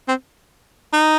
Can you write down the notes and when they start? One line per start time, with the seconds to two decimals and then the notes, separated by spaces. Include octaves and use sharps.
0.08 C4
0.93 D#4